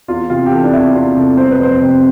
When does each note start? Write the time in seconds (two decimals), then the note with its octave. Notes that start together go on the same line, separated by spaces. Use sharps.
0.08 E2 F4
0.30 C3 F4
0.46 G4
0.52 E3 A4
0.64 D4
0.73 E2 E4
0.94 E2 F4
1.16 C3 A4
1.37 G1 C5
1.51 B4
1.59 F2 C5
1.81 C3